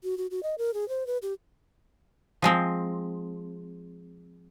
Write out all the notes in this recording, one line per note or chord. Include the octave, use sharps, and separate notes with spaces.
F#4
F#4
F#4
D#5
A#4
G#4
C5
B4
G4
F3 G#3 C4